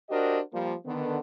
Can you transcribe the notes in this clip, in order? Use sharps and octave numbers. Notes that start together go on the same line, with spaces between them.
D4 F#4 G4 A#4 C5 D#5
F3 G3 A#3
D3 D#3 B3